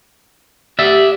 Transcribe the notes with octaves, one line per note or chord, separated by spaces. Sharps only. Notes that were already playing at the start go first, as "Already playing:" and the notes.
G4 D5 E5